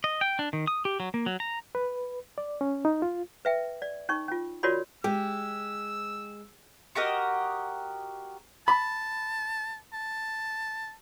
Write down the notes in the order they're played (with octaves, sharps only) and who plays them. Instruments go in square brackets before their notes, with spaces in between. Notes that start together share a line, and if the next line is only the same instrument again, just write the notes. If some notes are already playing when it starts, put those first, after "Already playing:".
[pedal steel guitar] D#5
G5
D4
D#3
D#6
G4
F#3
A#3
F#3
A#5
[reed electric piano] B4
D5
C#4
D#4
F4
[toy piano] B4 E5 G5
D5
C#4 D#4 C#6
C#4 F4
F4 F#4 A#4 C#5 D5 B5
[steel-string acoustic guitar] G#3 [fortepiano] G4 [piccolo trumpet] E6
[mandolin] F#4 G4 A#4 D#5
[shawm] A5 [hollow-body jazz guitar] B5
[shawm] A5